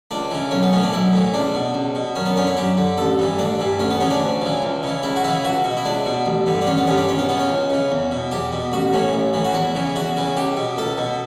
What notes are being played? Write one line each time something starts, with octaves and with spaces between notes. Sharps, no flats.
C#2 D4
C#3 E3
B1 C#4
B3
A2 E3 C#4
D4
B1 E4
A2 E3
C#2 D4
B2
C#2
B2
F#2 C#4
B3
D3 C#4
E4
F#2 G4
D3
A1 A4
G2 E3
A1 D4
G2 E3
D2 C#4
B3
C#3 E3 C#4
D4
D2
C#3 E3
C#2
C#3 E3
C#2 E4
F#4
C#3 E3 E4
C#2 F#4
B2
E4
C#2 D4
B2
A1
G2 D3
D4
A1 C#4
B3
G2 D3 C#4
D4
C#2 C#4
B3
C#3 E3 B3
C#4
C#2
C#3 E3
E2
B2
E2 G4
B2
A1 F#4
A2 E3 C#4
A1
A2 E3
F#4
E2 E4
C#3 E3
E2 F#4
C#3 E3
C#2 G4
B2
C#2 A4
B2